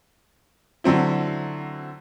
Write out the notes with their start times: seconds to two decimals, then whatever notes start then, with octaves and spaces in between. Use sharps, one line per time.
0.84 D3 F#3 C4 E4